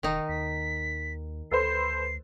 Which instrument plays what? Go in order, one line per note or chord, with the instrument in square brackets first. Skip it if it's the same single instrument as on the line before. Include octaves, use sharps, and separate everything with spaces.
[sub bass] E1 [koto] D#3 D#4
[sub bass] D#2 [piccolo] B6
[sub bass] D2 [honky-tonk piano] A4 B4 C5 [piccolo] C7